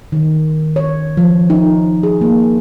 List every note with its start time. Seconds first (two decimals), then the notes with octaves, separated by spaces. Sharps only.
0.12 D#3
0.76 C#5
1.17 F3
1.50 D#4
2.03 G#4
2.21 A#3